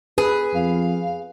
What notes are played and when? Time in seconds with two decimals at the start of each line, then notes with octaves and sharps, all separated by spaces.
0.18 G#4 B4
0.54 F2 F5